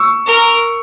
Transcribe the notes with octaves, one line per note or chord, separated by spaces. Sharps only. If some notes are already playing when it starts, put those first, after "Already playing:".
Already playing: C#6 E6
A#4